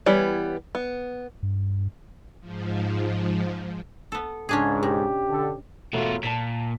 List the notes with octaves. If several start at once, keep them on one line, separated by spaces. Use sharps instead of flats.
E3 G3 B3 E4 C#5
B3
G2
G#2 F3
B3 A4
C#2 G#2 C#4 D4 G#4
B2 G4
D3 A4
E1 B2 A3 F4 F#4
A#2 A5 B6